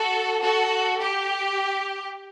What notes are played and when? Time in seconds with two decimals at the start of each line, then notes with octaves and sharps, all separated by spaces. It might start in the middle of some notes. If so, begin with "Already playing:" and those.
Already playing: F#4 A4
0.42 F#4 A4
1.01 G4